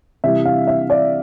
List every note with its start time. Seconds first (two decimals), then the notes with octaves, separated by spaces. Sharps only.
0.24 C3 E3 G3 E5
0.45 F5
0.67 E5
0.90 D5